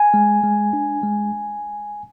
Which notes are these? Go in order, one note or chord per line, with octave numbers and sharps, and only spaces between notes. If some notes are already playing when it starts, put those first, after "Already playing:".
Already playing: G#5
G#3
G#3
D4
G#3